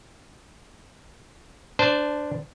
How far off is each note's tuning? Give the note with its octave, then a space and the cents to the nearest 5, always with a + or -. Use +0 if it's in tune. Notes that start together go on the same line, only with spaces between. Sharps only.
D4 +0 C5 -20 A5 +0